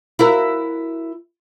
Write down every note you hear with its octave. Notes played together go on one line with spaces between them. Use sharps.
E4 F#4 A#4